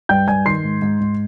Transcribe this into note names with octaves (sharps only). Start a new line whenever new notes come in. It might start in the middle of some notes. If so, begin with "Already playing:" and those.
G2 G5 G6
G2 G#5 G#6
D#3 C6 C7
G#2
G#2
G#2